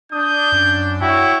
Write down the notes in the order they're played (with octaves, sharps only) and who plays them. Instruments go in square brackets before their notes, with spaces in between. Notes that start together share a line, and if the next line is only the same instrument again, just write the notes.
[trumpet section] D4 [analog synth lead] D#6 [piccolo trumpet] G6
[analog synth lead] F#2
[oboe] E4 [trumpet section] F#4 [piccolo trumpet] C#5 [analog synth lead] G5